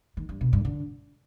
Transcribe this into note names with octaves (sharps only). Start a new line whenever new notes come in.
D#3
G2
B2
G2
D3